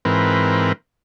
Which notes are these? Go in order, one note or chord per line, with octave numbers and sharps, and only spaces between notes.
G#2 E3 C4 A#4 B4